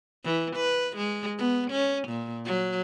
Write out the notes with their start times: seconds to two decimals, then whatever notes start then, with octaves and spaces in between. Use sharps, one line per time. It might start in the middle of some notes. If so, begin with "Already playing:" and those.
0.24 E3
0.56 B4
0.97 G#3
1.38 B3
1.70 C#4
2.08 A#2
2.46 F#3